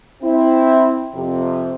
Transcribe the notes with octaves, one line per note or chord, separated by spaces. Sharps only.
C4 E4
F2 C3